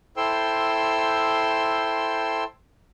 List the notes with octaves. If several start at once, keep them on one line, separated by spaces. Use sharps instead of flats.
E4 A4 C5 G5 C6 E6